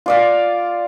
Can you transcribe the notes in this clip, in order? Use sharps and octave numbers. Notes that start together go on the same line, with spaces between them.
F4 D5 F5